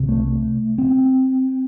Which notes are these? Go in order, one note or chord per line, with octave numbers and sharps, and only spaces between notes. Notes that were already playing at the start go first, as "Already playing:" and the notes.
Already playing: C2 C3
A3
C4